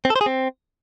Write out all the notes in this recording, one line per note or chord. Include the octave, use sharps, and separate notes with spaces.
C4
A4
C5
G#4
C4